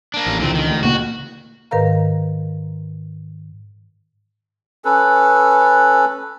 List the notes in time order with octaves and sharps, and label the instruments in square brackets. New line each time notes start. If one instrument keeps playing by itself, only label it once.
[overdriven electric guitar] A#3 D4
[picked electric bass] A1
[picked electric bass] C#2 D3 E3 [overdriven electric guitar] A#2 C4
[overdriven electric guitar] D#3
[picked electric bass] D2
[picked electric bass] A#2 C#3 A#3 [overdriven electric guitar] F#4
[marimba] G#2 D#3 A#4 B4 F5 A#5
[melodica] C#4 A4 B4